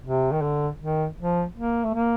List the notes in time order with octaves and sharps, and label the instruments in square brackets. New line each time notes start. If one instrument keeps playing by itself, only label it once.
[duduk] C3
D#3
D3
D#3
F3
A#3
A3
A#3